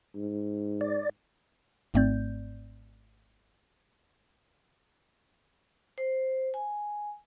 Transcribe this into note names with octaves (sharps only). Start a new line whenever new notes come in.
G#2
D5
G#1 G#2 A3 C4 D5 G6
C5
G#5